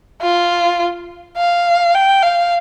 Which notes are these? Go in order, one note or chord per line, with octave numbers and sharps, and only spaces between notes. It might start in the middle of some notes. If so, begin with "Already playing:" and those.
F4
F5
G5
F5